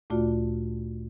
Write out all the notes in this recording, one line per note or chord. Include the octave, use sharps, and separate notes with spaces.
D2 A#2 A3 F4 F#4 D5